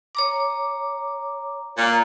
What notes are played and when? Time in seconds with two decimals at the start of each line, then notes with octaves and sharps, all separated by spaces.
0.15 C#5 A#5 D6
1.77 A#2